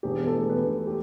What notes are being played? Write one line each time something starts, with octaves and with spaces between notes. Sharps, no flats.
E1 G4
E2
A4
A3
B2 B4
E1
G4